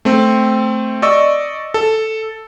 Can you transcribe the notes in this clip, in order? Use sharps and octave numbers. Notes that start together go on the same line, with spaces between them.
A3 C4
D5 D#5 C#6 E6
A4